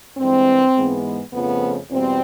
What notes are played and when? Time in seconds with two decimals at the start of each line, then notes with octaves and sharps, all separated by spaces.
0.17 G2 E3 G#3 C4
0.76 G#2 E3 G#3 B3
1.32 F2 C#3 F3 A3 B3
1.90 E2 B2 G3 C4